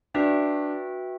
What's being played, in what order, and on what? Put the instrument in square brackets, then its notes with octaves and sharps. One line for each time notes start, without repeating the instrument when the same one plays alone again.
[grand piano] D4 [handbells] F#4 B4 E5 G5